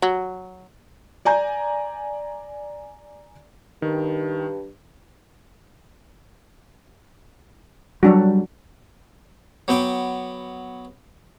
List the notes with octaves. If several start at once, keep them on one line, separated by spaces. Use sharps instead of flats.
F#3
D5 G#5 A#5 G6
G2 D#3
F#3 G3 D4 F#4
F#3 B3 G5 D6